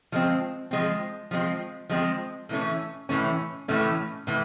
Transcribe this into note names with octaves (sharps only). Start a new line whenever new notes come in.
F3 G#3 C4
F3 G#3 C4
F3 G#3 C4
F3 G#3 C4
A2 E3 A3 C#4
A2 E3 A3 C#4
A2 E3 A3 C#4
A2 E3